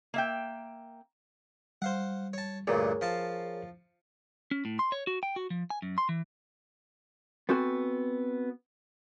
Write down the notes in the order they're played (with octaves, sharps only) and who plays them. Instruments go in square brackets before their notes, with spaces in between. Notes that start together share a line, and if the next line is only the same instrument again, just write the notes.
[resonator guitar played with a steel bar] A#3 E5 G5
[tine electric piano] G3 [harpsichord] C5 F5 F#5
[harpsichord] C#5 A5
[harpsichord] D2 G2 A#2 [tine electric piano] G#4 A#4 C#5
[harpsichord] F3 F5 A5
[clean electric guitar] C#4
A2
C6
C#5
F#4
G5
F#4
F3
G#5
F#2
C6
E3
[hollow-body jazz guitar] B3 C4 F#4 A4 G#5